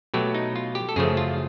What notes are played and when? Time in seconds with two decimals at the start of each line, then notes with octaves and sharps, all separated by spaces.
0.14 B2 F#3 A3 G4
0.35 D#4
0.56 F4
0.75 G4
0.89 A4
0.96 F#2 C#3 F3 A3 G#4
1.17 F4